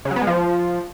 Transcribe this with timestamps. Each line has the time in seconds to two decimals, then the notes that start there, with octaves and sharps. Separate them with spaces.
0.05 C#3
0.11 F#3
0.16 B3
0.22 G#3
0.27 F3